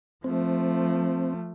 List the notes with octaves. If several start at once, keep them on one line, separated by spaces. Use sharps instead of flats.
F3 A3 C4